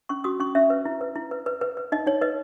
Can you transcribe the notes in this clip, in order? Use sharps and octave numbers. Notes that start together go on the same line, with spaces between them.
C#4 C#6
F#4 D#6
C#4 C#6
C#4 E5
B4
E4
B4
E4
B4
B4
B4
B4
D#4 D#5
D#4 C#5
B4 D#5